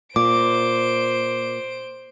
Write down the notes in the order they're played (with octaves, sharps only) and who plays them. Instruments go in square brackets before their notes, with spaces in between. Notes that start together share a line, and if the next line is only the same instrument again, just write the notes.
[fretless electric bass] A#2 [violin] C5 D7 [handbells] D6